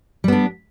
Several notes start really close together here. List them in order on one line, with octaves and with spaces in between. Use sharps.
G3 B3 D4